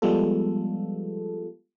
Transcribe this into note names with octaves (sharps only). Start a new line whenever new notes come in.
F3 G3 G#3 B3 F4 A4